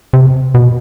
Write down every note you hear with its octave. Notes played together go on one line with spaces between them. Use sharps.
C3
B2